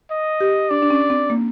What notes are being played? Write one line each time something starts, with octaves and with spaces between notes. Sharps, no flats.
D#5
G4
D4 D5
D4
C#4
C4
A#3